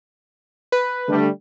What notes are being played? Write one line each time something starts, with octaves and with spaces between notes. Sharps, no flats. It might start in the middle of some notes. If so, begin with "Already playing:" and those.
B4
D3 G3 A3